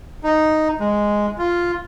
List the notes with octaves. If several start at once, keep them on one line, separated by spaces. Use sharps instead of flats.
D#4
G#3
F4